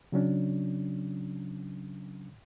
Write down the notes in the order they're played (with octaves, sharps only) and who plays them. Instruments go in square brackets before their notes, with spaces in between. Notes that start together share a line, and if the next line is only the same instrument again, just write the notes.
[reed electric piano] C#3 F#3 C#4 D4